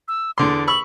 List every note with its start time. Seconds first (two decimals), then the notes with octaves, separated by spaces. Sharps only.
0.08 E6
0.38 E2 D3 C6 D6
0.68 B5 C#6 E6 F#7